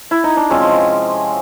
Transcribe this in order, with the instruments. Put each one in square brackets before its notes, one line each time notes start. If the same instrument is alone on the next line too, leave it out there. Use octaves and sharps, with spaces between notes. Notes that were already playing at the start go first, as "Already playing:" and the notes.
[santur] E4
D#4
D4
[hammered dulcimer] C3 F3 G#3 C4 [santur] C#4